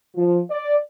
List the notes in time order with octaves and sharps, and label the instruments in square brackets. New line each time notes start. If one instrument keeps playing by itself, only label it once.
[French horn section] F3
D5